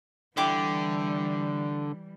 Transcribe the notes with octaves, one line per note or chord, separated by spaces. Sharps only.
D3 E3 G3 E4 G4 D6